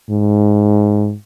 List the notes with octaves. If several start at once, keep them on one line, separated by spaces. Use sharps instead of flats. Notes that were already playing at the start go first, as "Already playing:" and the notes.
G#2